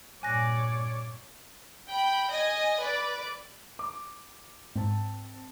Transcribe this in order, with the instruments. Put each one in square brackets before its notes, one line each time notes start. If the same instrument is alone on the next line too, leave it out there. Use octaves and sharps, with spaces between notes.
[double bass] G2 A#2 [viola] C#5 D5 [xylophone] G#5 F#6 A#6
[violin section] G5 B5
D#5 G#5
B4 D5 D6
[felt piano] D6
[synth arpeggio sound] G#2 [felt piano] C4 A5